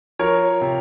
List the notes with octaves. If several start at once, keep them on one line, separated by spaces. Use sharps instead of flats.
F3 A#4 C#5
C3